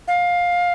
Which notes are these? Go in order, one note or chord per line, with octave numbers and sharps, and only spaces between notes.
F5